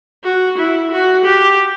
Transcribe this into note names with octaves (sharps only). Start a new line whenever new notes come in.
F#4
E4
F#4
G4